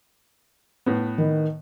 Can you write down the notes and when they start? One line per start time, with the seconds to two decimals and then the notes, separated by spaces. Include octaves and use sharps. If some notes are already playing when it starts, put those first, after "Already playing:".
0.86 A2 B3
1.18 D#3